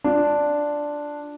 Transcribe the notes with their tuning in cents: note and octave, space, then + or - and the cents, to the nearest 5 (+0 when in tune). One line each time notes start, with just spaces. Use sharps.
D4 +0 F4 +0